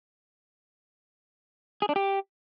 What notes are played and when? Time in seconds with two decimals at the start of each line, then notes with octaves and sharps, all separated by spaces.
1.82 G#4
1.89 D4
1.96 G4